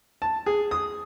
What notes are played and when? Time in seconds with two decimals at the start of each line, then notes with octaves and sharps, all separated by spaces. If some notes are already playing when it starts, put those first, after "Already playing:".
0.22 A5
0.46 G#4
0.71 D#6